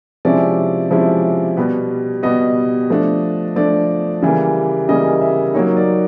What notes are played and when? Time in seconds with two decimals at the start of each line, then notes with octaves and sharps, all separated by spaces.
0.25 C3 F3 G#3 C#4 E4 D5
0.90 C3 F3 G#3 C#4 E4
1.57 B2 G3 B3
2.23 B2 G3 B3 D#5
2.90 F3 A3 D4
3.56 F3 A3 D4 D5
4.22 C#3 E3 G3 A#3
4.89 C#3 E3 G3 A#3 D#5
5.22 E5
5.54 F#3 A#3 D#4 C#5
5.77 D5